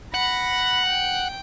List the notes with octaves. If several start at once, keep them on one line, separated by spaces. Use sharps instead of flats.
F#5 B5 A#6
G5